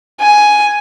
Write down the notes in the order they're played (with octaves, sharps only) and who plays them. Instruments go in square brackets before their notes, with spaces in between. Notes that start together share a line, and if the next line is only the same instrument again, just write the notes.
[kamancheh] G#5